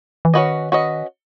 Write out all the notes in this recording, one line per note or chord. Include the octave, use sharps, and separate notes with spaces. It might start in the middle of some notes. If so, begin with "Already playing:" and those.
E3
D#3 C#4 F#4 B4 D#5
C#4 F#4 B4 D#5